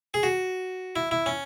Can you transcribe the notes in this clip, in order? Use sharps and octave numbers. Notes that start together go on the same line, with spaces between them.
G#4
F#4
E4
E4
C#4